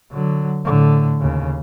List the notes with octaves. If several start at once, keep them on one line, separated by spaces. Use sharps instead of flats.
D3 F#3
A2 D3
D#2 C#3